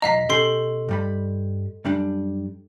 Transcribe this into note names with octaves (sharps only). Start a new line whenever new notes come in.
B1 E2 D#5 F5 A#5 B6
B2 C#4 G4 A4 C6 C7
G2 G3 B5
F#2 G3 D4